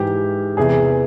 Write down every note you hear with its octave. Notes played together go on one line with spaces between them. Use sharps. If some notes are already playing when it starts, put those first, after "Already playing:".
Already playing: G#2 E3 G4
E2 C3 E3 G#4